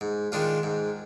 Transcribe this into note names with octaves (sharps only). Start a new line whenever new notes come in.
G#2
D#3 G#3 D4 F4
G#2